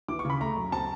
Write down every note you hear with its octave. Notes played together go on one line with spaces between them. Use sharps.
E3 D6
C#6
C#3
B5
A3 A#5
F#2
C4 A5